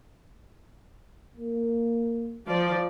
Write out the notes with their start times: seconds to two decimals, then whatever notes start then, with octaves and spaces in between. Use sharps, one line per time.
1.37 A#3
2.47 F3 D5